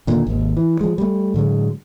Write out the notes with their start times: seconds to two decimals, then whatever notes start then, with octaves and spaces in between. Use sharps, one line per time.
0.07 D#2 A#2 D3
0.27 G#1 D#2
0.57 E3
0.81 F3 G#3
0.98 G3 A3
1.34 A2 D3 F#3 G#3